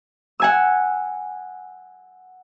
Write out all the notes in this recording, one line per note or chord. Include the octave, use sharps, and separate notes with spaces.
F#5 G#5 E6